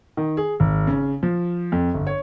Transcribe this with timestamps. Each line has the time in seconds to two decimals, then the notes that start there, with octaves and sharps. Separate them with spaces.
0.17 D#3
0.37 G#4
0.60 G#1
0.87 C#3
1.23 F3
1.72 F2
1.94 G1
2.07 C#5